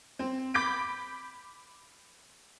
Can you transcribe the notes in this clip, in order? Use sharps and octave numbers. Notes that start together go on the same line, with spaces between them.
C4
B5 D6 G6 B6 D7